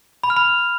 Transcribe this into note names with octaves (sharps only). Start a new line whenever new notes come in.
B5
F6
B5